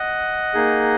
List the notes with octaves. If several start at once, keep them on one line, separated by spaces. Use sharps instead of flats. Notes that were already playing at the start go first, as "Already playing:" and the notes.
Already playing: D#5 F#5
A#3 D#4 G#4